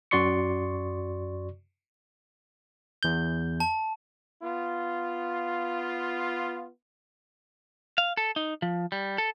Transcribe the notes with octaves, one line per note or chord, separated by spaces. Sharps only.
F#2 F#4 D5 C6 C#6 C#7
E2 G6
A5
B3 F4
F5
A4
D#4
F3
G3
A4